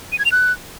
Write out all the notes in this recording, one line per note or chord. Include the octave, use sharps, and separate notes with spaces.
D#7
G#6
F7
F#6